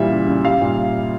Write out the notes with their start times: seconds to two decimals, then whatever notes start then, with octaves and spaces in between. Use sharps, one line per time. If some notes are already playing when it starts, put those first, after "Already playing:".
Already playing: A#2 E3 G3 E5
0.10 C#3
0.27 C#3
0.44 G3 F5
0.61 A#2